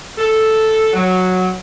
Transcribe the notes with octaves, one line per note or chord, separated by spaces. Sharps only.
A4
F#3